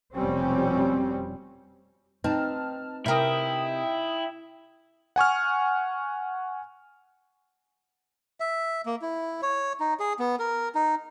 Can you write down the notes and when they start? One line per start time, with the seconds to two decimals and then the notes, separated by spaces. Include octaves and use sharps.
0.14 F1 B2 G3 C4 C#4
2.24 C4 D#4 B4 D#5 A5 F6
3.06 C3 E4 A#4 E5 G5 D#6
5.16 F#5 G#5 C#6 F6
8.40 E5
8.86 A#3
9.02 E4
9.42 C#5
9.80 D#4
10.00 G#4
10.19 B3
10.39 A#4
10.75 D#4